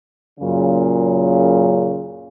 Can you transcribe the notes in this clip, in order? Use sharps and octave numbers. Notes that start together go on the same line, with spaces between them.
F#2 A#2 C#3